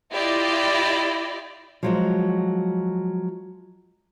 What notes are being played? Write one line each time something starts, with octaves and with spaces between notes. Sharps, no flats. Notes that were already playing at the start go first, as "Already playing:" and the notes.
E4 F4 G4 D5 D#5
F3 F#3 G#3